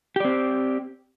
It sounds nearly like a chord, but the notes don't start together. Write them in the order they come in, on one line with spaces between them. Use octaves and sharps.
G4 D5 C4